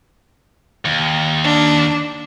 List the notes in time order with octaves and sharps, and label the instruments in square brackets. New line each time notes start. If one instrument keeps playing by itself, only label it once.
[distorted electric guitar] D#2
[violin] D4